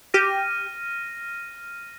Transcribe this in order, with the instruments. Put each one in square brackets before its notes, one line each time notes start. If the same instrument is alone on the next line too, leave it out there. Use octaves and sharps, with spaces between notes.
[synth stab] G4 [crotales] F6 A#6 D#7